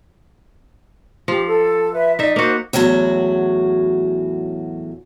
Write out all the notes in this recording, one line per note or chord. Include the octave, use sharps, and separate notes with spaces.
F3 G4
A4
B4 E5
D#4 D5 E5
A#3 F#4 C5
E2 A2 F#3 F#4 C#5